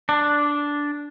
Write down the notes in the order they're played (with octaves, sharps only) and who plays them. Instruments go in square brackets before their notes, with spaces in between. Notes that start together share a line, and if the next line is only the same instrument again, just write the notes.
[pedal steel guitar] D4